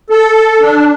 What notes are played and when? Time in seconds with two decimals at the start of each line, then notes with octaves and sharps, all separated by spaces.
0.10 A4
0.61 D4